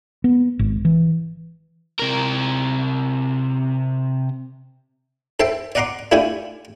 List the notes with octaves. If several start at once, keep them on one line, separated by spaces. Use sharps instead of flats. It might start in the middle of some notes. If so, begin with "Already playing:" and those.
B3
G#1
E3
C3 A#4
A4 C5 E5 G5 A5
D5 D#5 F#5 A#5 C6 D6
A3 D4 E4 F4 G4 G#5